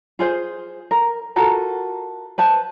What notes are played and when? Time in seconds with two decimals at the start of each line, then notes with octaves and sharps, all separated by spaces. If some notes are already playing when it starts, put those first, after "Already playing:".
0.19 F4 G#4 C5
0.91 A#4
1.36 F4 F#4 A4 A#4
2.38 B4 C5 A5